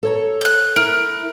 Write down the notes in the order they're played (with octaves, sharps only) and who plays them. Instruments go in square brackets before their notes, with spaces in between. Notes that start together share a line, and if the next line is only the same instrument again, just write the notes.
[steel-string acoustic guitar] A4 C#5 A#5
[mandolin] F#6 G6
[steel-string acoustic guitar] E4 [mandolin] A#4